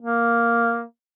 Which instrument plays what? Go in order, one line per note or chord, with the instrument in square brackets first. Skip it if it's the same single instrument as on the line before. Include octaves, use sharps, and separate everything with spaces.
[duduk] A#3